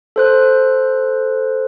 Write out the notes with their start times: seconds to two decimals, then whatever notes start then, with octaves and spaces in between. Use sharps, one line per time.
0.16 A4 C5 F#6